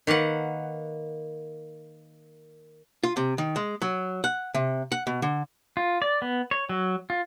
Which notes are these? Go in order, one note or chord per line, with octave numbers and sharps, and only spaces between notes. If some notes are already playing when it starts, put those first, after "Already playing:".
D#3 A#3 B4 F#5
F4
C3
D#3
G#3
F#3
F#5
C3
F#5
B2
D3
F4
D5
B3
C#5
F#3
F4